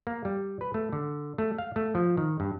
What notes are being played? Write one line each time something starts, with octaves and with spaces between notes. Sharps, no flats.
A#3
G3
B4
A3
D3
A3
F5
A3
F3
D#3
G2